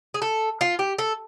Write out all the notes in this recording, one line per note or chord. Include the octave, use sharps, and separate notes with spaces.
G#4
A4
F4
G4
A4